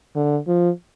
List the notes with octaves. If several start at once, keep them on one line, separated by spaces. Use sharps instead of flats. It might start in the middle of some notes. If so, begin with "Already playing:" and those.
D3
F3